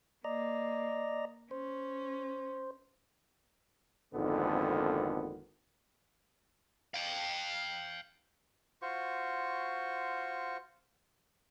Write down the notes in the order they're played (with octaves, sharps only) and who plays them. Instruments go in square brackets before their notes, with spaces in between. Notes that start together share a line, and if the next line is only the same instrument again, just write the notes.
[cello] A#3 [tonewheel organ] D5 D#5 A#5
[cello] C#4 [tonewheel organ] C5
[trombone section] G#1 F2 G#2 D3 A#3 B3
[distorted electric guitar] F5 G5
[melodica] F4 F#4 C5 C#6